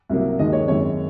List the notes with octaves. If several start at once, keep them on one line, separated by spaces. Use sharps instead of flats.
C2 C3 F#3 A#3
D#2 D#3 G#3 D#5
C#5
G#1 F#2 D#3 G#3 C#5